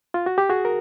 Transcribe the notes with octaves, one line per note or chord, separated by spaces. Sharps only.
F4
F#4
G4
F#4 G#4
A#4